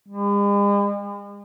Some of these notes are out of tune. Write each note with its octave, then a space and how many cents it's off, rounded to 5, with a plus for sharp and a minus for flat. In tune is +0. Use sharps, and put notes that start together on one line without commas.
G#3 -45